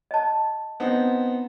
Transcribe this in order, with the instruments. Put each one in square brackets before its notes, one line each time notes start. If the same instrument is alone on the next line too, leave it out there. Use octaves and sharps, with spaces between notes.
[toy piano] D#5 A5
[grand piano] B3 C4 D#4